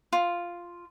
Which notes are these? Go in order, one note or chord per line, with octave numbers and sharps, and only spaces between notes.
F4